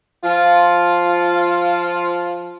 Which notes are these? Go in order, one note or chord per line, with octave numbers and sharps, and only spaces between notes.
F3 F4